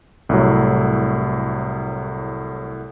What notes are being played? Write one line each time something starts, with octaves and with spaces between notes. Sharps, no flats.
C2 A2 F#3